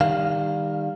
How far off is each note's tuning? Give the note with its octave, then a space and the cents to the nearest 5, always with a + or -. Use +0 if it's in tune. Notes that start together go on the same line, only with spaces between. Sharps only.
D#3 -5 G3 +25 F5 +0